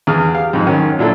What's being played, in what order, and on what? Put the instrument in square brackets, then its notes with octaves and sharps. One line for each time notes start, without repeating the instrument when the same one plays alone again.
[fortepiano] E2 G#4 F6
G4 F5
F2 G#2
D#3 F#3 C#4
A#2 F#3 D4 E4 A4